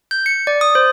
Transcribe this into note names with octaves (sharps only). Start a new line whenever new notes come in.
G6
C#7
D5
D#6
C5